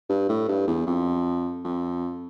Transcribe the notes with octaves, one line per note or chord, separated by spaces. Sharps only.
G2
A2
G2
E2
F2
F2